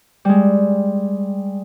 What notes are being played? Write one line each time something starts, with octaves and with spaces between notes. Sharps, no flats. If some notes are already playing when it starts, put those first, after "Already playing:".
G3 G#3